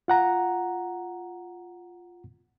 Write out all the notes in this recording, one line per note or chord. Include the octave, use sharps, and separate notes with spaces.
F4 F#5 A#5